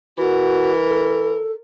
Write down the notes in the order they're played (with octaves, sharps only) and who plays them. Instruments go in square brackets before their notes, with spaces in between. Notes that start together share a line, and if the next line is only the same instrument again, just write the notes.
[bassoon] E3 [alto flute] F#4 [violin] A#4
[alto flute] A4